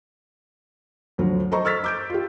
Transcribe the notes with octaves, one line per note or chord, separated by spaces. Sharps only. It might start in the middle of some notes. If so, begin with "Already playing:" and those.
D2 F3 F#3
A4 C5 D#5 A#5 C#6
C#6 E6 F6 A6 B6
D6 G6 D7
F4 G4